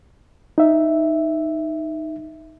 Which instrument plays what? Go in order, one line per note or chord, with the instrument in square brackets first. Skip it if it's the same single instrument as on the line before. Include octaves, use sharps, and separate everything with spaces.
[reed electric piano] D#4 E5